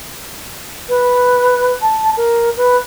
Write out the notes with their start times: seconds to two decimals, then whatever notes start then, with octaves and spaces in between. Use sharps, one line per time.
0.89 B4
1.82 A5
2.17 A#4
2.57 B4